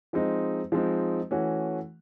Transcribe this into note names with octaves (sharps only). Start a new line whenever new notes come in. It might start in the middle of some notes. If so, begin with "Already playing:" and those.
F3 G#3 C4 D#4
F3 G#3 C4 D#4
E3 A3 C#4 F#4